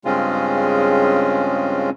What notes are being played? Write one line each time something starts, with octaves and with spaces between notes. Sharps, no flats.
G2 C#3 G#3 C4 C#4 F4